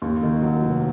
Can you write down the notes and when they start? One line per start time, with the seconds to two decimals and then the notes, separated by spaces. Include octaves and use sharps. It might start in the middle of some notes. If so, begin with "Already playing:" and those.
0.02 D#2
0.23 D#3
0.42 F#3
0.62 F1